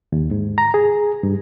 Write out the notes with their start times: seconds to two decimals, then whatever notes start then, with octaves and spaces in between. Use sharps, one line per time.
0.12 D#2
0.31 G#2
0.58 A#5
0.74 G#4
1.23 G2